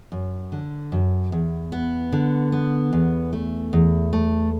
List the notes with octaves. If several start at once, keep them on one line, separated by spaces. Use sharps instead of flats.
F#2
D3
F#2
E2
B3
D3
B3
E2
A3
E2
A3